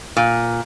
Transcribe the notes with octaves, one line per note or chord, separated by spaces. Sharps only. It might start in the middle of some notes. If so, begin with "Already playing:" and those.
A#2